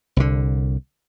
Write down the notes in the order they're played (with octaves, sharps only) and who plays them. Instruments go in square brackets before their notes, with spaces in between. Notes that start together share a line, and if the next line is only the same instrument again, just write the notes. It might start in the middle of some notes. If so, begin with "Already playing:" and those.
[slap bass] C2 D3